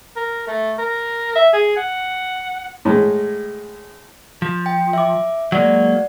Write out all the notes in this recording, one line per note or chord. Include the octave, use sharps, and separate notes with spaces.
A#4
A3
A#4
E5
G#4
F#5
A2 G#3
F3
G5
E5 D6
F#3 G#3 A#3 D5 F#5